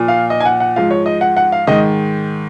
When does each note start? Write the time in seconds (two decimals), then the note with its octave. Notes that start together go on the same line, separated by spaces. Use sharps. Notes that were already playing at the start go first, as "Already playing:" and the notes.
Already playing: A#2 F3
0.08 F5
0.30 D#5
0.40 G#5
0.46 F#5
0.60 F#5
0.76 G#2 F3 F5
0.91 C#5
1.06 D#5
1.21 F#5
1.37 F#5
1.52 F5
1.67 G#2 D#3 D#5